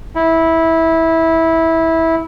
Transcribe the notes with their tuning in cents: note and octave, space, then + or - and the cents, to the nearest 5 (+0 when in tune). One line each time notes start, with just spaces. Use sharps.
E4 -15